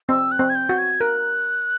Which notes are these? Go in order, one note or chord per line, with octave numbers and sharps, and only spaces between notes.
C4 E6
F#6
C4
G#6
G6
F#4
G#6
A#4 F#6